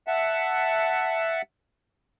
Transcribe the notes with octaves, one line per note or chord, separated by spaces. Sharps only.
E5 F#5 A5